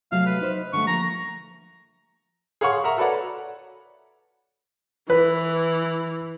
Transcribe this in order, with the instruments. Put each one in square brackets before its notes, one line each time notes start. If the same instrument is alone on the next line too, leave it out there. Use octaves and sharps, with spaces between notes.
[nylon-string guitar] C3 F#3 A3 [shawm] F5
[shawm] B4
[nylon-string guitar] D#4 C5
[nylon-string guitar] D3 G3 A3 [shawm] C#6
[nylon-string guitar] F3 A#3 [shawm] A#5
[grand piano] G#4 C#5 F5 F#5 C6 C#6
A#4 E5 F#5 A#5
F#4 A4 B4 C#5 D5 F#5
[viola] E3 [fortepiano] B4